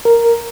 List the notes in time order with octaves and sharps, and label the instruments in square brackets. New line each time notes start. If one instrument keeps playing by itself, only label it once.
[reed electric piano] A#4